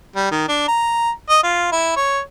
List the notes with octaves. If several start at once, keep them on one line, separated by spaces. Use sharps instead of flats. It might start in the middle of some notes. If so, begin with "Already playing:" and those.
G3
D#3
D4
A#5
D#5
F4
E4
C#5